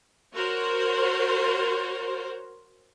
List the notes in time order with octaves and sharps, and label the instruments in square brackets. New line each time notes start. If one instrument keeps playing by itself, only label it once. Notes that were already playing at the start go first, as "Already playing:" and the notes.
[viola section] F#4 A#4 C5 C#5